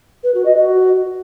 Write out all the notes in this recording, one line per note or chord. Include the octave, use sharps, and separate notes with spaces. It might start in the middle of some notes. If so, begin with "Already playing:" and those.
B4
F#4
D#5
F#4